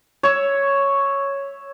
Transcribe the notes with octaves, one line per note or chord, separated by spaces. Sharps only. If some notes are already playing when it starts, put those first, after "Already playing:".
C#5 E5